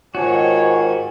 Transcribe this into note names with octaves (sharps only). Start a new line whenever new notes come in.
G#2 D#3 F4 F#4 G#4 C5 C#5 A5